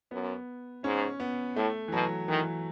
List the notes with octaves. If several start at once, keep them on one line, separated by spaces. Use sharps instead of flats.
F#2 B3
G#2 C#4
B3
A2 A3
E3
B2 F#3
D#3 E3